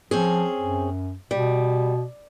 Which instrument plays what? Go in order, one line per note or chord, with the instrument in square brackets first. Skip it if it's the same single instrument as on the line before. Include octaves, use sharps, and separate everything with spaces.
[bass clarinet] F3 [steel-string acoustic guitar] C4 C#4 G#4
[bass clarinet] F#2
[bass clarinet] B2 [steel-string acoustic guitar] G3